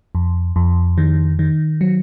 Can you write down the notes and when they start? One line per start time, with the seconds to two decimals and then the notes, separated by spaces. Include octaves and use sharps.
0.15 F2
0.56 F2
0.98 D#3
1.39 D#3
1.81 F#3